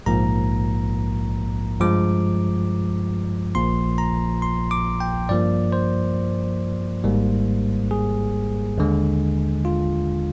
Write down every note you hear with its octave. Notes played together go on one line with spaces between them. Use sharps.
A#1 G#2 F3 A#3 A#5
G2 F3 G#3 D6
A#1 A#2 F3 A#3 C6
A#5
C6
D6
G5
G2 F3 A#3 D5
C5
G#1 G#2 G3 A#3
G#4
D#2 D3 G#3
F4